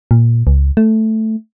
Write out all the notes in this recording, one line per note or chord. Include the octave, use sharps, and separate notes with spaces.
A#2
C#2
A3